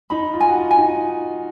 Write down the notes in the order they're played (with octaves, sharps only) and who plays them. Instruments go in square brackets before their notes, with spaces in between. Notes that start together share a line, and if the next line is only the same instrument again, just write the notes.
[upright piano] D#4 [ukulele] B5
[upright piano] F4
[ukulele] G#5
[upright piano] F#4
F4
[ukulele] G#5
[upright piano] D#4